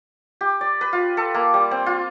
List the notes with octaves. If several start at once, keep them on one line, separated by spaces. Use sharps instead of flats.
G4
D5
B4
F4
A4
A#3
G3
C4
F4